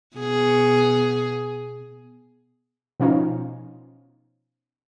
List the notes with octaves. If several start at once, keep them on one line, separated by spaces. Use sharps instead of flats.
B2 G#4
B2 F3 C#4 D#4 F4